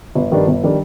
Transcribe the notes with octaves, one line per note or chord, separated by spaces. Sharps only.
G1
G2 D#3 G3 D4
G1
D#3 G3 D4